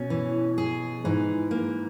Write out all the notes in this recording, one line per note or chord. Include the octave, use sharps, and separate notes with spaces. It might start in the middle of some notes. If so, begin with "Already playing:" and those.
Already playing: B2 C#4
E3
G#4
G#2 E3
A#3